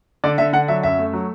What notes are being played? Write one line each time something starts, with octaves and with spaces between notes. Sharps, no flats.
D3 D5
D3 E5
D3 F#5
F#3 E5
F#2 E5
A3
F#3